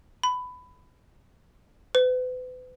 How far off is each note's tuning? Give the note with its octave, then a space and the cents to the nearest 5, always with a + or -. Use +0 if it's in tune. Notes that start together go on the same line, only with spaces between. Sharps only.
B5 +15
B4 +40